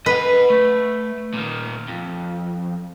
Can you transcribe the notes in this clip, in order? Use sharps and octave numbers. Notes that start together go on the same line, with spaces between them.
B4 D#5 F#5
A3
A#2 D#3
F2